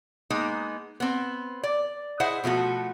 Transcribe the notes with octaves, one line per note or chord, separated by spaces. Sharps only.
G#3 A#3 B3 D#4
B3 C4
D5
E4 G#4 C5 D#5 E5 F#5
B2 F3 A3 F#4